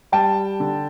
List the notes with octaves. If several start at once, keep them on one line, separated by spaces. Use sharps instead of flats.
G3 G5 A5
D3